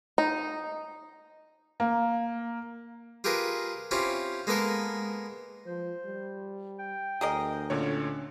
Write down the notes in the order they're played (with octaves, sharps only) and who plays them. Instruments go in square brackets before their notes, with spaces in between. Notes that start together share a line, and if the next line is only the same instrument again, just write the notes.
[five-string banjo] D#4
[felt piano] A#3
[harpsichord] F4 G4 G#4 A#4 B4
C4 C#4 E4 F4 G4
G#3 A#3 B3 A4 A#4
[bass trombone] F3 [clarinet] C5
[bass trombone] G3
[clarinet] G5
[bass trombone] D2 [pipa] G#4 A#4 D#5
[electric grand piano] A#2 D3 C#5 [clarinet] C#4